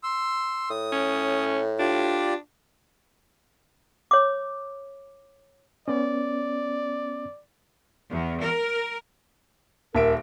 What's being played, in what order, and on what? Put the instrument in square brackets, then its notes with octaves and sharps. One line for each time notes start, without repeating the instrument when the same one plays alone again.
[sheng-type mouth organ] C6 E6
[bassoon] A2 [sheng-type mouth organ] D#6
[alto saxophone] C#4
[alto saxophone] D4 [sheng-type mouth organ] F4 G4 D5
[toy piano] C#5 D6
[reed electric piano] B3 C#4 [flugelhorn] D5
[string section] E2
A#4
[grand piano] D#1 E5 D7 [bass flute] A#4